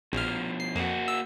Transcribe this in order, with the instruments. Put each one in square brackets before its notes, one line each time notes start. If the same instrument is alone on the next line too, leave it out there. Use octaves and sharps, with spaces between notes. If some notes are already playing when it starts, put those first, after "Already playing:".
[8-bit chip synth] A#1 F6 [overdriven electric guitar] B2 F3
[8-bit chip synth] C7
[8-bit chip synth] F2 [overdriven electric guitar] A#3 F#4
[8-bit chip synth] E6